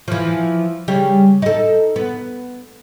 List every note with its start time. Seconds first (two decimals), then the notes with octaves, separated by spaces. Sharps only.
0.08 E3 F3
0.88 C#3 G3
1.42 D#4 A4
1.96 B3